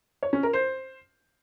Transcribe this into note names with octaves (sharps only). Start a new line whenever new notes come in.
C#5
C#4
A#4
C5